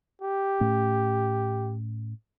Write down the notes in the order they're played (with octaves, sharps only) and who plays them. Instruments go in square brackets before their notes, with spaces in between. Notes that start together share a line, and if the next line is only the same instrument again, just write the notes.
[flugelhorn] G4
[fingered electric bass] A2 A3 C#4